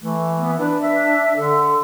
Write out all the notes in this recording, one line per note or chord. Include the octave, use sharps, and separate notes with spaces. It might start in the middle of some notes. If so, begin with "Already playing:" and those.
E3 A3
B3
D4 B4
E5
D3 A4